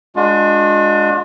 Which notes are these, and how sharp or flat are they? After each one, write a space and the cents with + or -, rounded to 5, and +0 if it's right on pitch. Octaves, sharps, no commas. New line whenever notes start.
G#3 +0 D4 +0 F4 +45